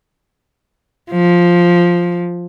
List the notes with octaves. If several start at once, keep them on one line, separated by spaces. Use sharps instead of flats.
F3